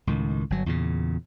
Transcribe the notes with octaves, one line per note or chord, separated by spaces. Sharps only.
C#2 A2 D#3
G1 F#3
E2 A#2 C#3